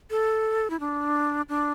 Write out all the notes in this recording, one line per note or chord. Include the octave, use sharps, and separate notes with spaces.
A4
E4
D4
D4